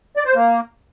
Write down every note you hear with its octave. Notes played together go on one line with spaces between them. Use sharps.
D5
C5
A#3